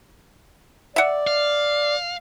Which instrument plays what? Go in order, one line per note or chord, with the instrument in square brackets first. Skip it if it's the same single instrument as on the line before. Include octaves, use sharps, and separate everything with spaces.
[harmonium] D5 [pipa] E5 F#5
[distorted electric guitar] F5